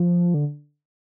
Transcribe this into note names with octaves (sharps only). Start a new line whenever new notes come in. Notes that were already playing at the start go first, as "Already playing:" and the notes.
Already playing: F3
D3